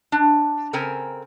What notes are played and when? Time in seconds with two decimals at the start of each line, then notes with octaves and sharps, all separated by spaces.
0.12 D4
0.73 C#3 C4 A4 A#4 G#5 A#5